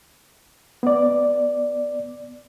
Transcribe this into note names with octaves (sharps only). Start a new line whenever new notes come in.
B3 D5